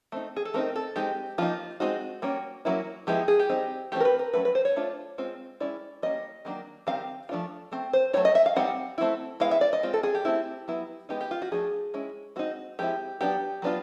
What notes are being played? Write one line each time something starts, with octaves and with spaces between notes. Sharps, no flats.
A3 C4 D#4
G#4
A4
A3 C4 D#4 A#4
A4
G#3 C4 D#4 G4
F3 A#3 D#4 F4
G#3 C4 D#4 F#4
G3 A#3 C#4
F#3 A#3 C#4 E4
F3 G#3 B3 E4 G4
G#4
G4
G3 C4 D#4
E3 A3 C4 F4 G4
A#4
B4
A#4
F#3 A3 C#4 B4
B4
C5
C#5
A3 D4 F4
G#3 C4 F4
G#3 C#4 E4 D5
G3 A#3 C#4 D#5
D#3 F#3 A#3 D4
D#3 G3 C4 F5
F3 A3 D4 F4
A3 C4
C5
F#3 A3 C4 E4 C#5
D#5
E5
F5
G3 C4 D#4 F#5
A3 C4 E4
G#3 B3 E4 F5
E5
D5
D#5
G#3 C4 F4
A4
G#4
G4
A3 C4 E4
F#3 B3 E4
G#3 B3 D#4 G4
G4
F4
F#4
F3 A3 D4 G#4
G#3 C#4 E4
G#3 C4 D#4 F#4
F3 G#3 C4 E4 G4
F#3 B3 D4 G4
F#3 B3 D4 F4